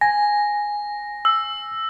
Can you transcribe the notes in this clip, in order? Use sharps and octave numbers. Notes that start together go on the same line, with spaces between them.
G#5 A#6
E6